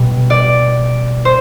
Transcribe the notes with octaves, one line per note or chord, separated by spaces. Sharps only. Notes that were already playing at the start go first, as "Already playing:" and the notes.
Already playing: B2 G3 B3
D5
C5